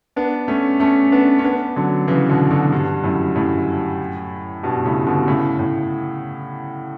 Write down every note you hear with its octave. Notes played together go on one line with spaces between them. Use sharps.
B3 D4
A3 C#4
A3 C#4
B3 D4
C#4
B3 D4
D3 F#3
C#3 E3
B2 D3
B2 D3
G2
F#2 A2
F#2 A2
G2 B2
A2 C#3
B2 D3
A2 C#3
A2